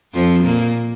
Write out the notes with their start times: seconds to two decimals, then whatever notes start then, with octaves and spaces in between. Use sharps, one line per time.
0.14 F2 F3
0.44 A#2 A#3